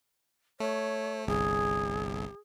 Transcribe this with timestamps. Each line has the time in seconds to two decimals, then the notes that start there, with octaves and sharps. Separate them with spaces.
0.60 A3 C#5
1.27 G1 C2 G#4